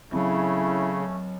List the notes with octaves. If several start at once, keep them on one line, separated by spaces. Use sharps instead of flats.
C#3 F#3 A3 C4 C#4 E4